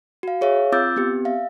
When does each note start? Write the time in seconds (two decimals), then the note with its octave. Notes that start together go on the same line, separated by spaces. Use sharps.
0.23 F#4 F5
0.41 G#4 C#5 E5 F5
0.72 C4 F4 D6 E6 G6 A6
0.97 B3 C4 G4
1.25 E5 F5